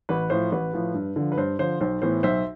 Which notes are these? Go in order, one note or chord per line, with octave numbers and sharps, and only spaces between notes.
A1 B4
A2 F3 C5
A1 B4
A2 F3
G2
D3 F3
B4
G2 C5
D3 F3 C5
B1 C5
A2 E3 B3 C5
B1 C5 E5